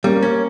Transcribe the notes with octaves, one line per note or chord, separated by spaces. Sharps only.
G3 A#3 C#4
C#4